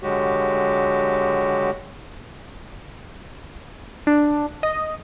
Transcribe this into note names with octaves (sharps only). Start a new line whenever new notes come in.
D3 F#3 G#3 F#4 G4
D4
D#5